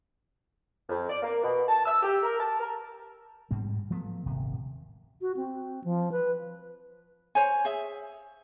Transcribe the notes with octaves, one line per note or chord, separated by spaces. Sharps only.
F2
D5
A#3
B2
A5
E6
G4
A#4
A5
A#4
G#2 G3 C4
F3 F#3 A3 B3
D#1 G#1 C3
F#4
C4
F3
B4
C5 C#5 G#5
G#4 E5